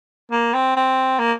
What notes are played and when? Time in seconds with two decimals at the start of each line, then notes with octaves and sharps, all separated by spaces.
0.31 A#3
0.54 C4
0.76 C4
1.19 A#3